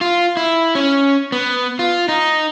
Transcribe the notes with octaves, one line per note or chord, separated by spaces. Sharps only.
F4
E4
C#4
B3
F4
D#4